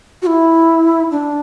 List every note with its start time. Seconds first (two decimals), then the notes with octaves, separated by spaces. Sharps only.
0.22 F#4
0.27 E4
1.11 D4